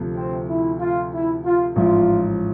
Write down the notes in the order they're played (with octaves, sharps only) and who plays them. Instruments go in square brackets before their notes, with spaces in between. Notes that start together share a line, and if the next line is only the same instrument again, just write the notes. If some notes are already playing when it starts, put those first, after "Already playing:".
Already playing: [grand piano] D2 C3 F3 A3
[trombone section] C4
E4
F4
E4
F4
[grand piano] A1 G#2 F3 [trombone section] F4